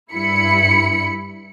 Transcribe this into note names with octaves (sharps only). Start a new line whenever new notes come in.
G2 E4 B5 C#7